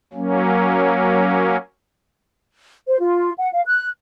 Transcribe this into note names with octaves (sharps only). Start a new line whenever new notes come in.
F#3 A#3 C#4
C5
F4
F#5
F5
F#6